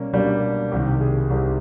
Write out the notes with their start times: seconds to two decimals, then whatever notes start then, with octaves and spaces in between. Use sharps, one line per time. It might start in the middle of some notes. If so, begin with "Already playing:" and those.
Already playing: B2 G3 A#3 C#4
0.13 B2 G3 A#3 D4
0.72 C2 C3 D#3 G4
1.01 G#4
1.30 C2 C3 D#3